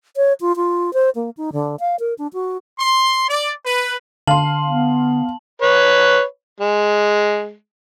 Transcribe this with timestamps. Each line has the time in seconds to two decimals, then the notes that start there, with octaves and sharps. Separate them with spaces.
0.17 C#5
0.41 F4
0.56 F4
0.94 C5
1.15 A#3
1.37 D#4
1.53 D3
1.80 F5
2.00 A#4
2.18 D4
2.33 F#4
2.79 C6
3.29 D5
3.66 B4
4.27 D3 F5 A5 C6 F#7
4.67 B3
5.62 B4 C#5
6.60 G#3